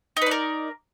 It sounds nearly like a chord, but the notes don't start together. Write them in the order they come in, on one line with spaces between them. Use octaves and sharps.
D#4 B4 D5 A#4